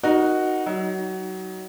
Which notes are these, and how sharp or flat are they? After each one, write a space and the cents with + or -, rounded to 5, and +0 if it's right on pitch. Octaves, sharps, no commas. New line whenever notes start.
D#4 +0 F#4 +0 A#4 +30
F#3 +25 D#4 +25